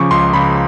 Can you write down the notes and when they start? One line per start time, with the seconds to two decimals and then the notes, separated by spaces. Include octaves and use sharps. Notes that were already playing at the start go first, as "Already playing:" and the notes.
Already playing: C#3 F3 C#6 D6
0.11 C#2 C6
0.34 C#2 B5